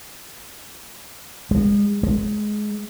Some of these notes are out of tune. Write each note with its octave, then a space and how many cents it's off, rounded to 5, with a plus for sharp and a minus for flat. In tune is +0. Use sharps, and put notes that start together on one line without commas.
G#3 -30
G#3 +15